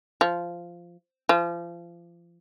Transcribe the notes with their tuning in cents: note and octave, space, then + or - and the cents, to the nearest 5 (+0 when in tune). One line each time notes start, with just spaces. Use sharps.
F3 -10
F3 -30